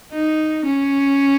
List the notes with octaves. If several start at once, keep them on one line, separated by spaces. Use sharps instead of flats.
D#4
C#4